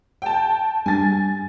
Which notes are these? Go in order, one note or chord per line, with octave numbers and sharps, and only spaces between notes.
G5 A5
G2 G#5 A6